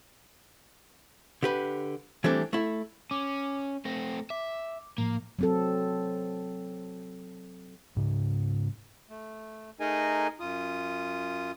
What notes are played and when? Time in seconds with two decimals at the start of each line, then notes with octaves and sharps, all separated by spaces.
1.43 D3 G4 B4
2.24 E3 G3 A3 C4 D4 A4
2.53 A3 E4
3.11 C#4 D6
3.85 A3 C4 A#6
4.30 E5 D6
4.98 A2 F3 A#3
5.39 F#3 C4 A4
7.97 G#2 C#3
9.09 A3
9.80 A3 D#4 G#4 A#4 D#5 G#5
10.40 F#2 F4 D#6